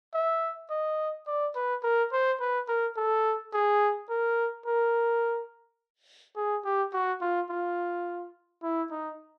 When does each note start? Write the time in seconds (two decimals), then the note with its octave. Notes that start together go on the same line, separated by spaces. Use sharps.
0.14 E5
0.70 D#5
1.27 D5
1.55 B4
1.83 A#4
2.12 C5
2.40 B4
2.68 A#4
2.96 A4
3.53 G#4
4.09 A#4
4.66 A#4
6.36 G#4
6.65 G4
6.93 F#4
7.21 F4
7.50 F4
8.63 E4
8.91 D#4